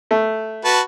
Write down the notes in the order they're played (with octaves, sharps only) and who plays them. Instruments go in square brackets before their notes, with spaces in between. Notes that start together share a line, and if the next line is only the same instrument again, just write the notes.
[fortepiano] A3
[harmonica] F#4 B4 A5